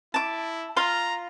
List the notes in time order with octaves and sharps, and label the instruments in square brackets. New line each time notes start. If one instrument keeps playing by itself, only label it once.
[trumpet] E4 [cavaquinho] A5 D6
[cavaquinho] F4 F5 C6 [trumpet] A#5